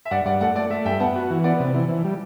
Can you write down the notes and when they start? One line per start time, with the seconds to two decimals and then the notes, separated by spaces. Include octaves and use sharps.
0.05 E5
0.11 G2 D5 F#5
0.25 G2 D5 F#5
0.41 A3 D5 F#5
0.55 A3 D5
0.70 A3 E5
0.85 G2 E5 G5
1.00 B3 F#5 A5
1.16 F#4
1.30 E3
1.44 B3 D5 F#5
1.60 C3
1.75 E3
1.89 E3
2.04 G3